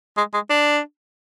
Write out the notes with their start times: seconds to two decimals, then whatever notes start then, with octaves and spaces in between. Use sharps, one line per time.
0.17 G#3
0.34 G#3
0.50 D4